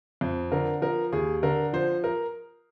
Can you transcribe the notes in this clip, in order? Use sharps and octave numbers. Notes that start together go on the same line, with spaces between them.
F2
D3 A#4
F3 A#4
D#2 G#4
D3 A#4
F3 C5
A#4